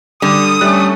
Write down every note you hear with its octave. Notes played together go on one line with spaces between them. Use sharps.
D3 G3 D#6
G3 A3 C#4 F#6